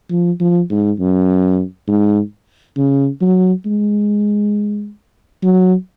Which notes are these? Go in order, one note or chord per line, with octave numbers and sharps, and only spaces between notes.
F3
F3
G#2
F#2
G#2
C#3
F#3
G#3
F#3